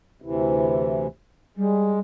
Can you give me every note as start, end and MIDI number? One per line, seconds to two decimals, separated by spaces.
0.22 1.07 38
0.22 1.07 48
0.22 1.07 52
1.57 2.01 55
1.57 1.99 56